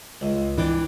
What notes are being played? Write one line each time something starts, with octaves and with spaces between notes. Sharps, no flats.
C#2
E3 D4 G5